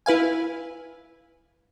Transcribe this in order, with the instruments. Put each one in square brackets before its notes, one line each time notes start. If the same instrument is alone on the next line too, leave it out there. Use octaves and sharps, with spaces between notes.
[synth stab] E4 B4 F5 G#5